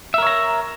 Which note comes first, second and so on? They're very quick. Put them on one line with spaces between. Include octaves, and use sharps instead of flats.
E5 A#4 C#5 A#5